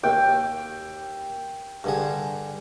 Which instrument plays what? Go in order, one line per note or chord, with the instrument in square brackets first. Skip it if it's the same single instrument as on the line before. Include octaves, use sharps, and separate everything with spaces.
[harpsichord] D#2 [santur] G5
[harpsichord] G2 D3 G#4